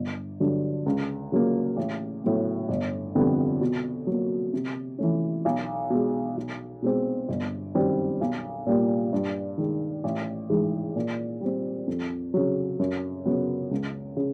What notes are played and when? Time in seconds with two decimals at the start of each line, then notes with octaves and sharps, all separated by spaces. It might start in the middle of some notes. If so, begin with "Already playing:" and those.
Already playing: G1
0.40 G2 D3 F#3
0.86 C#2
1.32 C#3 F#3 A#3
1.77 A1
2.24 A2 F#3 B3
2.69 G1
3.15 F2 D3 G3 B3
3.61 B2
4.07 F#3 A#3
4.53 C3
4.98 E3 A3 C#4
5.45 B1
5.90 B2 G#3
6.37 B1
6.82 B2 G#3 C4
7.29 G1
7.74 F#2 D#3 G3 C4
8.21 B1
8.67 A#2 G3 A#3
9.13 G2
9.58 D#3 G#3
10.04 A1
10.50 G#2 E3 G#3
10.96 A#2
11.41 G3 C4
11.87 F2
12.34 C#3 F#3
12.79 F#2
13.25 C#3 F#3 B3
13.71 C#2
14.17 C#3